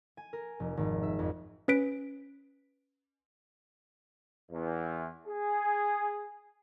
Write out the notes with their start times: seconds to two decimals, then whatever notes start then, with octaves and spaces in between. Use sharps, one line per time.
0.17 G#5
0.33 A#4
0.60 F1
0.77 G#1
1.03 E5
1.19 F2
1.68 C#4 B4 B6 D7
4.51 E2
5.27 G#4